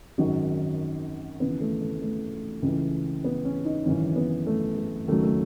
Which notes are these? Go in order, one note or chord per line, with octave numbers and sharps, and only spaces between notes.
G#1 F#2 D#3 F#3 F#4
D#2 C#3 E3 B3
A3
A3
A3
C#2 C#3 E3
B3
C#4
D#4
G#1 F#2 C#3 E3 C#4
B3
A3
A3
D#2 C#3 F#3 A3
A3